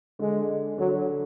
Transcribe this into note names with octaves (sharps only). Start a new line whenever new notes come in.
D3 G#3
D3 F#3